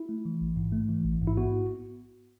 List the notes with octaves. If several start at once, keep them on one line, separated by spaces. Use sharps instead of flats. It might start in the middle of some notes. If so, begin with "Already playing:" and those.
Already playing: E4
A3
E3
A1
G#2
A3
E3
A1
G#2
E4
B3 F#4